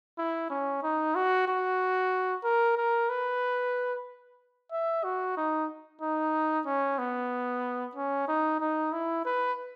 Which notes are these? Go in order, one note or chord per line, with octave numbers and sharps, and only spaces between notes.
E4
C#4
D#4
F#4
F#4
A#4
A#4
B4
E5
F#4
D#4
D#4
C#4
B3
C#4
D#4
D#4
E4
B4